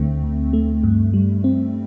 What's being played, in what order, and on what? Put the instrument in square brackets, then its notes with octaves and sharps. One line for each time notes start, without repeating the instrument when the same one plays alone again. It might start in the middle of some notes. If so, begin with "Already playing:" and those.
Already playing: [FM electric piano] D2 D3 A3 C4
D2
A3
G2
G3
C4